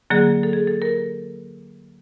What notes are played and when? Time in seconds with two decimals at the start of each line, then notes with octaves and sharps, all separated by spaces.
0.10 D3 F#3 A#3 G#4
0.43 A4
0.53 G#4
0.67 A4
0.82 A#4